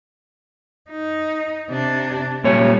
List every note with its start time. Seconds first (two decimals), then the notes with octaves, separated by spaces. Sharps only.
0.90 D#4
1.70 C3 D4
2.44 A#2 G3 C#4 C#5